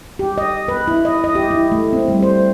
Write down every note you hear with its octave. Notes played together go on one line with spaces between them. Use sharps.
G4
D#5
B4
E4
D#5
D#5
G4
E4
A3
C4
G3
C5